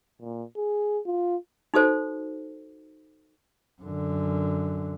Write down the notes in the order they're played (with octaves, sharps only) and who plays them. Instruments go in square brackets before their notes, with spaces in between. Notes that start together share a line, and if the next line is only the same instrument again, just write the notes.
[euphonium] A#2
G#4
F4
[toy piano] D#4 F#4 A4 C5
[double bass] F#2 D3